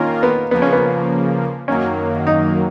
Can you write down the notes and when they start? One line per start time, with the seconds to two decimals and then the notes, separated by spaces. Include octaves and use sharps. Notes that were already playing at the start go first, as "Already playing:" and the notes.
Already playing: D#3 A#3 C#4 F4 A#4
0.23 B3
0.51 C#3 F3 A#3 B3
0.62 C#4
0.73 B3
1.68 F#2 D#3 F#3 A#3 C#4
2.27 D#4